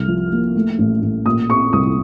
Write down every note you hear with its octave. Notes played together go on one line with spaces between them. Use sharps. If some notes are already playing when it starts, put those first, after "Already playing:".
Already playing: C2 F6
F3
A#3
A3
A1
A1
A#2 D#6
C4 C#6
C2 D#6